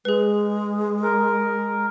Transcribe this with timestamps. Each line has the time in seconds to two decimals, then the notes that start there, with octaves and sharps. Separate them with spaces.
0.05 G#3 G#4 B4
1.02 A#4